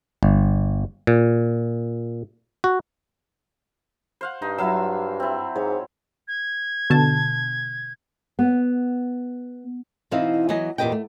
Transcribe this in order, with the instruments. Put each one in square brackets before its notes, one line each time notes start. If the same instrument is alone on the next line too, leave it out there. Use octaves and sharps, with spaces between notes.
[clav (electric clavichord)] G1
A#2
F#4
[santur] C5 F5 F#5
[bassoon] G2 [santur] D#4
[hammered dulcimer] F#3 F4 [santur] E4 F5 E6
[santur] C4 E4
[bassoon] G#2 [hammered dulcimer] C#5
[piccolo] G#6
[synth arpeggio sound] B2 D3 A5
[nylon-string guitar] B3
B2 E3 C4 D#4 E4 F5
E3 F#3 B3 D#5 G#5
E2 A#2 G4 B4 D#5 G5
A3